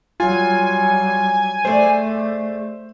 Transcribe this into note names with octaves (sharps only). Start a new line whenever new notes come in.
F#3 G3 F4 G#5
A3 G#4 C5 D5